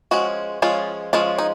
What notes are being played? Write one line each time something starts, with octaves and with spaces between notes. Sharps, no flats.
F3 G#3 C#4 F#4
F3 G#3 C#4 F4
F3 G#3 C#4 F4
D#4